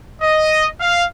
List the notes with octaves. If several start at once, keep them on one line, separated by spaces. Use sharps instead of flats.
D#5
F5